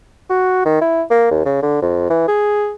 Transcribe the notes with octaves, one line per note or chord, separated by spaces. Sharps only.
F#4
D#3
E4
A#3
D#2
C#3
D3
F2
E3
G#4